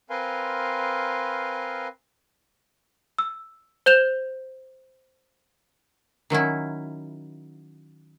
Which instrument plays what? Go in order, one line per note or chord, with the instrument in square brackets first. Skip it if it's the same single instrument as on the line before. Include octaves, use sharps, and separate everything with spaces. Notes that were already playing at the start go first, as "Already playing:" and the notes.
[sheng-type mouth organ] C4 A#4 B4 F5 G#5 C6
[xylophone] E6
C5 G6 E7 F7
[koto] D#3 F#3 C#4 E4